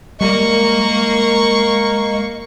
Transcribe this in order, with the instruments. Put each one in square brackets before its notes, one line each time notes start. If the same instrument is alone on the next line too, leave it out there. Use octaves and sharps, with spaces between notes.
[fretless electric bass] G3 [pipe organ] G#3 [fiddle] A#3 A#4 [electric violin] C#6